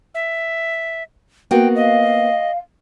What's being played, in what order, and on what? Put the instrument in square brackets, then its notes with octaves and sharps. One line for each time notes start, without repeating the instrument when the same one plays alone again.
[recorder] E5
[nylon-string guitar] A#3 B3 F#4 [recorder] G5
[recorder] D#5 [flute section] F5